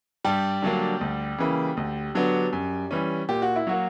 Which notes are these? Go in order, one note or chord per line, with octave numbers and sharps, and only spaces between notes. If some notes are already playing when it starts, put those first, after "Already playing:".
G2 G3 G4
D3 F#3 A#3 D4
D2
C#3 E3 A#3
D2
D3 F#3 B3 D4
F#2
E3 G3 C#4
A#2 G4
F#4
E4
F#3 A#3 F#4